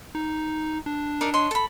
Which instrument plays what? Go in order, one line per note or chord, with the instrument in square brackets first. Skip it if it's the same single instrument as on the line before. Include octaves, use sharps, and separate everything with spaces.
[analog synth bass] D#4
D4
[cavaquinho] D#4 A#4 D5
C#5 D#5 C6
A4 B5